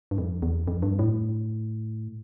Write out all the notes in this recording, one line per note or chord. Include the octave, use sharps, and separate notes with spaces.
G2
F2
E2
F2
G2
A2